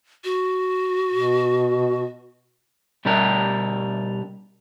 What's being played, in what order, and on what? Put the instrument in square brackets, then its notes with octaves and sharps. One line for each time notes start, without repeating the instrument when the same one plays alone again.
[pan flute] F#4
[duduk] B2
[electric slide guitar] B2 G3 D4 G4 A#4